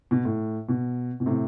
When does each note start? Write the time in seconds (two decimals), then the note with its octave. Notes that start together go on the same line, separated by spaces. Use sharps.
0.11 B2
0.25 A2
0.69 B2
1.20 B2
1.26 A2 C3